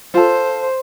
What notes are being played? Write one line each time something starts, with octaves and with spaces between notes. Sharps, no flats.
F4 A4 C5